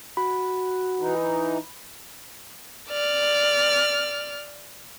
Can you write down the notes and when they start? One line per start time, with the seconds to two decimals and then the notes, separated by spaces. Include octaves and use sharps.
0.17 F#4 B5
0.99 E3 D#4
2.89 D5 F6